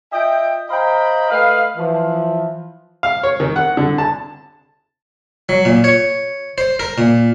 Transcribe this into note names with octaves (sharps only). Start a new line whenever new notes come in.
F4 D#5 E5 G5
C5 D#5 F5 G5 A#5 B5
A3 B4 D#5 F5
E3 F3
F5
C#5
D#3
F#5
D3
A5
F#3
A#2
C#5
C5
A#4
A#2